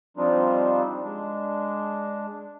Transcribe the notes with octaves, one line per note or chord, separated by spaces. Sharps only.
F3 G3 C4 D4 D#4 F4
G#3 D4